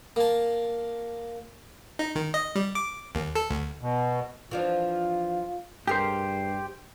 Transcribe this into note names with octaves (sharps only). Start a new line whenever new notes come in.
A#3 A5
D#4
D#3
D#5
G3
D6
D#2
A4
D2
B2
E3 F3 D4 F4
G2 G4 G#4 A#4 C5